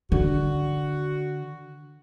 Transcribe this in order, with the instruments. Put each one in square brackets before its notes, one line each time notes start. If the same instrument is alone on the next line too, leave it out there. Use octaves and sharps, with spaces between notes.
[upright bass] D3 [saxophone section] F#4